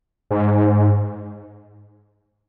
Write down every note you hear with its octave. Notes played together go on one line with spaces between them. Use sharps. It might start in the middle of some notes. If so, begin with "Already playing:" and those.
G#2